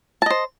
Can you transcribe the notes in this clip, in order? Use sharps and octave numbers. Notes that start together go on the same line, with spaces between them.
C5 D#5 A5